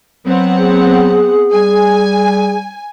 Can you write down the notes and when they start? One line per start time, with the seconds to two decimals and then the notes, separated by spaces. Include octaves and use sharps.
0.26 F#3 B3 C4 F#5
0.59 G#4
1.52 G3 G#5